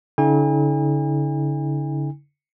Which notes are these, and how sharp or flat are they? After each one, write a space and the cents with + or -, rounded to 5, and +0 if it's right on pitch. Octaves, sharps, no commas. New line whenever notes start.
D3 -45 E4 -45 G#5 -40